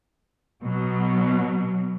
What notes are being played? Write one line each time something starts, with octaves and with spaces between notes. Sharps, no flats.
B2 F#3